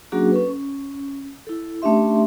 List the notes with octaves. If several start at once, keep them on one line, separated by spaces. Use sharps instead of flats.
F#3 A#3 C#4 D4 F#4 G#4
C#4 A4 B4
C#4
E4 A4
A3 C#4 D4 G4 E5 C6